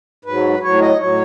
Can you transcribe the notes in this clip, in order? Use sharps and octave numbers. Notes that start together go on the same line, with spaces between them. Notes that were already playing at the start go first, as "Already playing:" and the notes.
G#2 F#3 B4
A2 F#3 C#5
D#5
A2 F#3 C#5